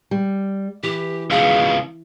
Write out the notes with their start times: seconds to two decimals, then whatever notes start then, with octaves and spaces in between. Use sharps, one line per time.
0.11 G3
0.83 E3 G4
1.31 C#2 B2 G#4 F5